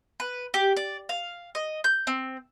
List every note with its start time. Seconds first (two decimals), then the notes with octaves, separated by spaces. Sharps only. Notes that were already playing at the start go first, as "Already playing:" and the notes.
0.20 B4
0.54 G4
0.76 D5
1.09 F5
1.55 D#5
1.84 G6
2.07 C4